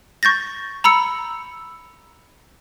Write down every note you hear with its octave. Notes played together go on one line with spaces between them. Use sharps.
C#6 G6 A6 A#6
A#5 B5 E6 C#7